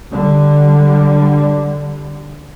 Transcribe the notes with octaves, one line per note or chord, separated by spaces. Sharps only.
D3 G3